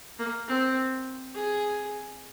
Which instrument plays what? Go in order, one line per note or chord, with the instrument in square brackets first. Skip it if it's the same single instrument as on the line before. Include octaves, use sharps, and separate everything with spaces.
[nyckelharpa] A#3
C4
G#4